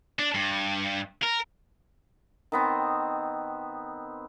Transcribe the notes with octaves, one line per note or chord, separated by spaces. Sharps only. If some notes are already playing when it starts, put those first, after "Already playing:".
D4
G2
A#4
D#3 B3 C4